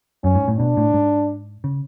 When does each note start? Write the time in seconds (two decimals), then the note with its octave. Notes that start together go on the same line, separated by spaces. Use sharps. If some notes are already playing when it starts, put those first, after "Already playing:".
0.24 F#2 C#4
0.35 G#2
0.48 A2
0.58 B2 D4
0.77 A2
0.94 G#2
1.64 C#3